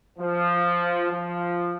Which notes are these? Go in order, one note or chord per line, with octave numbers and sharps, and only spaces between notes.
F3
F3